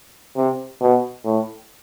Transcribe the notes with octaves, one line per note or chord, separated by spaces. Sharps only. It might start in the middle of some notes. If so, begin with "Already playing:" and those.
C3
B2
A2